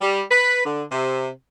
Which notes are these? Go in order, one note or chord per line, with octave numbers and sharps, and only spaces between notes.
G3
B4
D3
C3